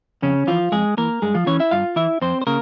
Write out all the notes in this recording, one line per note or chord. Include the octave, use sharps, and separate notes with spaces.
F2 C#3 C#4
E3 F3 F4
F2 G#3 G#4
E3 A#3 A#4
G2 G#3 G#4
F3 F4
E3 C#4 C#5
E4 E5
G2 F4 F5
E3 E4 E5
F2 C4 C5
C5
C#3 A#3 A#4